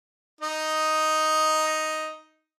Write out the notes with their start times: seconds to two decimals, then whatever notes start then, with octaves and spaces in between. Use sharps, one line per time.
0.41 D#4 D#5